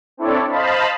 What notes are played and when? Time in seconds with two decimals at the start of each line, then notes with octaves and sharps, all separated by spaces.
0.17 C4 D4 E4 A4 C#5 D5
0.49 C5 D#5 F5 A5 B5